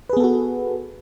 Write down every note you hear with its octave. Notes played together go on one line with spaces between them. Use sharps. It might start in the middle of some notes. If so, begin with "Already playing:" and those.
B3 F#4 G#4 A4 B4